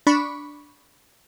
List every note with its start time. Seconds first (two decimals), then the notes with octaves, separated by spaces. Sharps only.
0.07 D4 B5 C#6